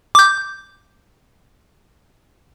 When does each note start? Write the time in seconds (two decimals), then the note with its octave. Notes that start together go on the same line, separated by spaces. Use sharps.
0.15 D6 G6